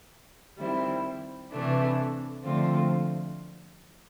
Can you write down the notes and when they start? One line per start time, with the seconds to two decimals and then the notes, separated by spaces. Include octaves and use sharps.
0.57 D#3 G3 C4 E4
1.50 C3 E3 A3 D4
2.43 D3 F3 A3 C4 F4